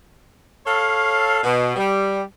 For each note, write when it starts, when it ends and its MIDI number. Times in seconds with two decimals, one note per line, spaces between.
0.66 1.39 69
0.66 1.39 73
0.66 1.39 77
1.44 1.74 47
1.76 2.21 55